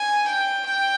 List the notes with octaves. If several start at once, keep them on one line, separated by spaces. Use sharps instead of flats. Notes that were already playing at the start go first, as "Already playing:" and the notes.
Already playing: G#5
G5
G5